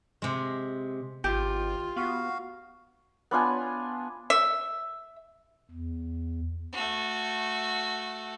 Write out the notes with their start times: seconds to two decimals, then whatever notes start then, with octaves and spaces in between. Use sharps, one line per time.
0.22 C3 G#3
1.24 G#1 F4 G4
1.96 B3 F#4 F5
3.31 B3 D4 F4 G#5
4.30 E5
5.71 E2
6.73 A3 F#4